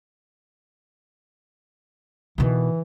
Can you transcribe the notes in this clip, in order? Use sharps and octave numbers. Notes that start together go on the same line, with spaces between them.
B2 D#3 E3